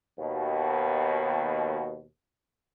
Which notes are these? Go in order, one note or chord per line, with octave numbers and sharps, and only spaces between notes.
D#2 B2